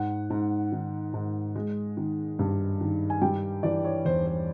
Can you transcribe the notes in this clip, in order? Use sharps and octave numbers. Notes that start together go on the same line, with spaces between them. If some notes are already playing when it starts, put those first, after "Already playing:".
Already playing: G#2 F#5
G#2
D#3
G#2
G#3
D#3
G2
D#3
G#5
G3 G5
E3 D5
C#5
E2 C5
C5